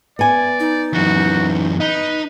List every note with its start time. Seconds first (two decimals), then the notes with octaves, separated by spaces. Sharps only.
0.19 B3 D5 G#5
0.60 D#4
0.94 F#2 E3 F#4
1.80 D#4 B4